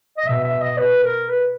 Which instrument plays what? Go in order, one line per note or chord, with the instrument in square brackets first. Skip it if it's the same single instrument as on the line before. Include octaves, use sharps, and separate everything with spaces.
[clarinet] D#5
[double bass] B2 [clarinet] E5
[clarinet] E5
D#5
B4
A#4
B4